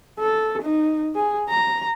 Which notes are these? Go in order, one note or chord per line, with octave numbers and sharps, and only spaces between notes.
A4
D#4
G#4
A#5